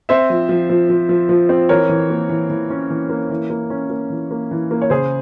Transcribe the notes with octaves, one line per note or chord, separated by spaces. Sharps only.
C4 C5 E5
F3
F3
F3
F3
F3
F3
C4
E3 A#4 C#5
E3
A#3
E3
E3
C#4
E3
A#3
E3
A#3
C#4
A#3
E3
A#3
E3
A#3
C#5
C#3 G#4 C5